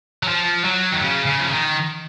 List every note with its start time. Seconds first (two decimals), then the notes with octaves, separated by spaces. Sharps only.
0.23 F#3
0.28 F3
0.64 F#3
0.92 D#3
1.01 C#3
1.26 C#3
1.40 F3
1.50 D#3